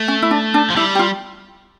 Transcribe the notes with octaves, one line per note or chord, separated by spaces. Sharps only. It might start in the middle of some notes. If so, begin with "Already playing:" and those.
Already playing: A3
C#4
E4
D4
D4
F3
G3 E4
G4
F4